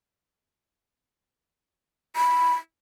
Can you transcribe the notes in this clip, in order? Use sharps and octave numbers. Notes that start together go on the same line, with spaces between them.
B5